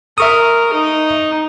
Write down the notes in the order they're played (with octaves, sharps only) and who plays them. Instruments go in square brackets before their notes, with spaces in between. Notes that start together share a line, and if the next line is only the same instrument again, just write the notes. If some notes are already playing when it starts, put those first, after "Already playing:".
[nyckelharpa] A#4 [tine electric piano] E5 C#6 D#6
[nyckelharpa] D#4